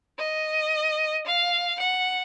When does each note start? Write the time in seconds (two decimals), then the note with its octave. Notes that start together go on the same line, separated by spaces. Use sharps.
0.19 D#5
1.27 F5
1.80 F#5